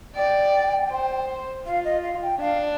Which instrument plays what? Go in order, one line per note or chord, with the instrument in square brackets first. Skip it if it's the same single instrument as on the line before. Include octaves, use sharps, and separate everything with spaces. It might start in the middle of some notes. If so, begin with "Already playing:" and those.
[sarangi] D5 [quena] G5
[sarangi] C5
[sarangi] F4 [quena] F5
[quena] D#5
F5
G5
[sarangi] D4 [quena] F5